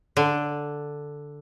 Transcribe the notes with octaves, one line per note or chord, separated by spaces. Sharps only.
D3